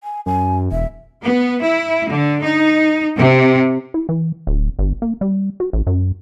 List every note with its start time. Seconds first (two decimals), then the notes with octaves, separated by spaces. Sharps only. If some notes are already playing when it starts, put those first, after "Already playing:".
0.04 G#5
0.26 F#2 G#5
0.72 E1 E5
1.23 B3
1.63 E4
2.09 D3
2.43 D#4
3.16 C3
3.94 E4
4.09 E3
4.47 D1
4.79 G1
5.02 A#3
5.21 G3
5.60 F#4
5.73 A1
5.87 F#2